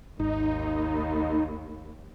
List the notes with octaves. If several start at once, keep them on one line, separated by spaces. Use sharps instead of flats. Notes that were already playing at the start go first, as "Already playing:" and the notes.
G#1 D#2 D#4